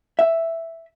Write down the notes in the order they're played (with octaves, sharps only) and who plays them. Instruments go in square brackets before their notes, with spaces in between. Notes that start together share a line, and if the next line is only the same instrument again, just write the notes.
[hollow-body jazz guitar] E5